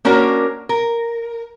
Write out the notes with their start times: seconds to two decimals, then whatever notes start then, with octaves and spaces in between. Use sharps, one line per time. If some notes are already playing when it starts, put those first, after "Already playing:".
0.05 A#3 C#4 D4 F#4 A#4
0.69 A#4